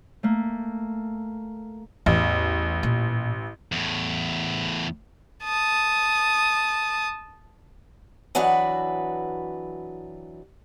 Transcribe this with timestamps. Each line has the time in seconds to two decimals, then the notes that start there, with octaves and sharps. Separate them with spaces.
0.23 A3 A#3
2.06 A1 E2
2.83 A#2
3.72 E2 A2
5.43 A5 D#6
8.35 E3 F#3 D4 F#4 B4 D#5